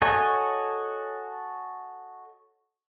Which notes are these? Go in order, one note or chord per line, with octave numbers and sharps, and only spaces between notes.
F#4 A4 C#5 D#5 G#5